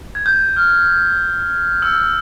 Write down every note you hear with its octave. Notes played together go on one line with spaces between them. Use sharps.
G#6
G6
F6
E6